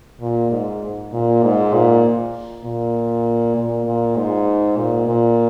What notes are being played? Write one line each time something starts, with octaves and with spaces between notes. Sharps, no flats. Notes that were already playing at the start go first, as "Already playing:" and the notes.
A#2
G#2
A#2
G#2
A#2
A#2
A#2
A#2
G#2
A#2
A#2